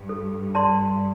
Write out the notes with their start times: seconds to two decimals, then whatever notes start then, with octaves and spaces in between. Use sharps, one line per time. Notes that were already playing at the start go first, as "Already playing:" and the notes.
Already playing: G2
0.09 A4
0.55 D5 A5 C6